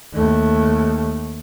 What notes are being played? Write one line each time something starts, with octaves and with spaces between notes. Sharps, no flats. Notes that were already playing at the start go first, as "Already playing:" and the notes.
D#2 A3